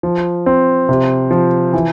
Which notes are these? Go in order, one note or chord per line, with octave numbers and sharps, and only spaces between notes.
F3
C4
C3
F3
E3